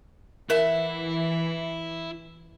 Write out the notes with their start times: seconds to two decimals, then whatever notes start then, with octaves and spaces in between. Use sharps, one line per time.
0.50 E3 E4 A#4 E5 F#5